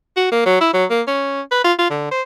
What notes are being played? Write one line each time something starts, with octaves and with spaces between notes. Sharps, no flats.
F#4
A#3
F#3
E4
F#3
A#3
C#4
B4
F4
F4
D3
C5